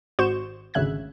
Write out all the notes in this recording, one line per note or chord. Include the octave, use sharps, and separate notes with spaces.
G#1 F#4 C5 C#6 G6 E7
G#1 D2 C#3 E5 F#6 G#6